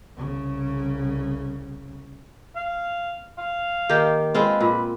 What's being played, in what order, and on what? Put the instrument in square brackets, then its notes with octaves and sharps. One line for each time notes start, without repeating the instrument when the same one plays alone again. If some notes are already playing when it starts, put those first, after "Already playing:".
[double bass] C2 C#3
[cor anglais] F5
F5
[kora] D#3 A#3 G4
[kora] G#3 C4 F4 [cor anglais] B4
[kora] A#2 [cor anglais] B4